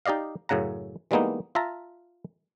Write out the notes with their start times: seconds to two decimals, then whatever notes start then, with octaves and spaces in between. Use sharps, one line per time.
0.06 D#4 G4 D5 D#5 F5
0.49 F#2 A2 C#3 F#5 A#5
1.11 E3 G3 G#3 A#3 B3 D#4
1.55 F4 E5 A5 A#5